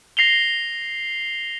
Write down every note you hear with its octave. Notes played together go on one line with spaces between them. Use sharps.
A#6 C7 F7 G7